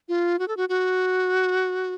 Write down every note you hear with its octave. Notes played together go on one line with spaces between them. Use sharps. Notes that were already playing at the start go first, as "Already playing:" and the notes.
F4
F#4
A4
F#4
F#4